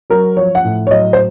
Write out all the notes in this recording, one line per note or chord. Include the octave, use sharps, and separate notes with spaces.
F#3 A#4
F3 C#5
F#5
A2
C#5
F#3 D#5
C5